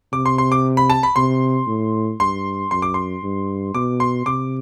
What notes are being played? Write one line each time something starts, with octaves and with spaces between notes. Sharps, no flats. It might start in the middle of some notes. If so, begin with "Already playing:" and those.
C3 D6
C6
C6
D6
B5
A5
B5
C3 C6
A2
G2 C6
F#2 C6
D6
C6
G2
B2 D6
C6
C3 D6